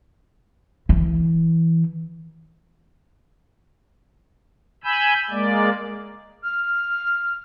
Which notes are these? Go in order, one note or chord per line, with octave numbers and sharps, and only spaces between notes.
E3
G#5 B5 E6 G6
G#3 A#3 D5
F6